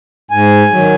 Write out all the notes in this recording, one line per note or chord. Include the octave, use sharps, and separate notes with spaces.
G#2 G#5
D#3 F#3